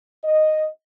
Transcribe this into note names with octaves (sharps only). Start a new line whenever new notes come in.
D#5